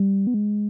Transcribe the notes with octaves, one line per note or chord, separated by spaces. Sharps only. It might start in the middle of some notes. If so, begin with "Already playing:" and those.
Already playing: G3
B3
G#3